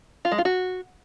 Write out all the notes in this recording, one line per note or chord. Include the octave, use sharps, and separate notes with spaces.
F4
G#3
F4
F#4